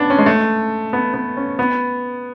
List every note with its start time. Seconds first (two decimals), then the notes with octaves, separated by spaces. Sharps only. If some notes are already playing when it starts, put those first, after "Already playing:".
Already playing: B3 C#4 D4
0.10 C#4
0.19 G#3
0.26 A3
0.93 B3
1.14 B3
1.37 C#4
1.59 B3